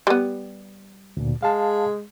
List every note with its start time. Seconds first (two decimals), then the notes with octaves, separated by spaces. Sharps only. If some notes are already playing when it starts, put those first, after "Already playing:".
0.07 G3 B3
1.17 D2 A#2
1.42 G#3 F5 A5